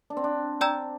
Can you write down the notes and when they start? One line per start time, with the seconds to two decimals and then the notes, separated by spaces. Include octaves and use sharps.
0.10 D4
0.17 C4
0.24 D4
0.60 D4 D5 G5 A#5 E6 G6